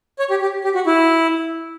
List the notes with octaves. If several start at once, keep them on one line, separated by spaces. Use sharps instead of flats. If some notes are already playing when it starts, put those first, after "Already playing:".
C#5
G4
G4
G4
F#4
E4